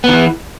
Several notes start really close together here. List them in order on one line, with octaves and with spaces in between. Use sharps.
B3 D#3 E3